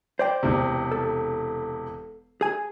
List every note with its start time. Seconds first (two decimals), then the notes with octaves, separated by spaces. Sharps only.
0.19 C5 D5 G5
0.43 E1 C3
0.92 A4
2.41 G#4 G#5